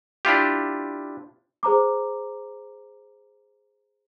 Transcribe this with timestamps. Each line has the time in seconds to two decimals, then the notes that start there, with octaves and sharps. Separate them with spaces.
0.25 D4 E4 F4 G4
1.63 G#4 C5 A#5 D6